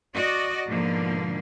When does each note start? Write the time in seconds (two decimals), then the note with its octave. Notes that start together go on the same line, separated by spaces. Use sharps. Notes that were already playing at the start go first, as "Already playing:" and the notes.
0.13 F#4 D5 D#5
0.66 G#2 B2 D3 F3 A#3